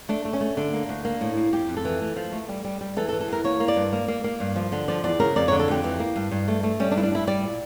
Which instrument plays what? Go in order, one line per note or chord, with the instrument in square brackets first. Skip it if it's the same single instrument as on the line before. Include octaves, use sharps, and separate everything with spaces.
[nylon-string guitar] A3 D4
A3
C#4
A3
D3 D4
A#3
D2
A#3
A2
A#3
F2 G4
F2
A4
E3
A3
F3
A3
G3
G3
G3
E3 A4
A4
E3
A4
E2 A#4
A#3 C#5
A#3
D5
G2
A#3
A#3
A#3
G2
F3
D3
F3 D5
E2 D5
C#3 A#4
F2 D5
D3 C#5
A4
F2 G4
E3
A#3
G2
G2
A3
A3
G3 C#4
D4
G2 E4
D4
G3 E4
G3 D5
A#2